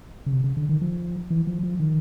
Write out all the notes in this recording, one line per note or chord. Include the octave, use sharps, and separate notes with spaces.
C#3
C3
C#3
D3
D#3
F3
E3
F3
F3
D#3